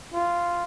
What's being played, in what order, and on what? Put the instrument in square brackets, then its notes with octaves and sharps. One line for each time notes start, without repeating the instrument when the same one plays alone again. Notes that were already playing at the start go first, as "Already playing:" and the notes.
[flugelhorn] F4